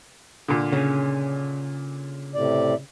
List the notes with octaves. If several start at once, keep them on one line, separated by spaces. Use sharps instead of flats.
A#2 D3
C#3 C#4
A2 C3 D5